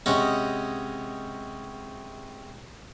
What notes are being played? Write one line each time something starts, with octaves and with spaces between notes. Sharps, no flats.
C3 G#3 C#4 D#5 F#5